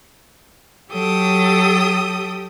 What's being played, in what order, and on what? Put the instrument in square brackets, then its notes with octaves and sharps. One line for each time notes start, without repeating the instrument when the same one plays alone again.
[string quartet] F#3 G4 A4 G5 D#6